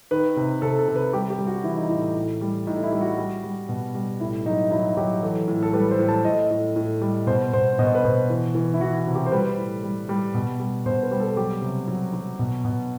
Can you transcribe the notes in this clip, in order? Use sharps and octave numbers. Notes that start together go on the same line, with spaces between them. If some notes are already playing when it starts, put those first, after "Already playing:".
D#3 B4
C3
C3 A4
A4
C3
B4
G3 G4
G4
G3
F#4
E3 E4
D#4
A2 E4
A2
G3
A2 D#4
E4
G3
F#4
G3
G3
B2
G3
A2 E4
F#3 D#4
F#3 E4
F#3 G4
E3 A4
A2
A4
G3 B4
C5
A2
A5
A2 D#5
A2
A2
G3
B2 C5
B2 C5
B2 D#5
C5
B4
B2 C5
E3
E3
E4
E3 F#4
F#4
C3
G4
C5
G3 B4
A2
G3
G3
B2
G3
B2 C5
B4
G3
A4
F#3 G4
C3
F#3
F#3
B2
B2